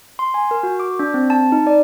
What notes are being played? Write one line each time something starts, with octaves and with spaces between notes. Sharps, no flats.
C6
G#5
A#4
F#4
D6
D4
C4
A5
D#4
D5